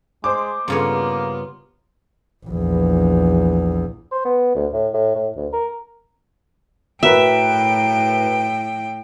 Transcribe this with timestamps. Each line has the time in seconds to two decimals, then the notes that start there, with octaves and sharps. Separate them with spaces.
0.24 G#3 C5 D6
0.68 G2 C#3 A#3 B3 F4 C#5
2.46 A#1 E2
4.11 C5
4.25 B3
4.55 D2
4.73 A2
4.94 A2
5.15 A2
5.36 D2
5.53 A#4
7.03 A2 F#4 A#4 B4 E5 G5